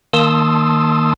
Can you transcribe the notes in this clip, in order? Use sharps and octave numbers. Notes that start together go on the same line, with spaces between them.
D#3 A#3 A5 C6 D#6 E6